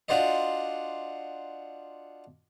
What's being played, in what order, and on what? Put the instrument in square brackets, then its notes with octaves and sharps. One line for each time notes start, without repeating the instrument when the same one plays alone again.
[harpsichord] D4 F4 F#4 C5 D5 D#5